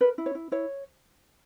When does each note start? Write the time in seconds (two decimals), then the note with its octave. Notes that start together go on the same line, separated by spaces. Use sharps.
0.01 A#4 B4
0.18 E4
0.26 C#5
0.35 E4
0.52 E4 C#5